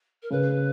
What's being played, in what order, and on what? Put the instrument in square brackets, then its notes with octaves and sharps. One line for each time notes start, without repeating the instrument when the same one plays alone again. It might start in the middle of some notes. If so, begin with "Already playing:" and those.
[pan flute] A#4
[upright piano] C#3 [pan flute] B4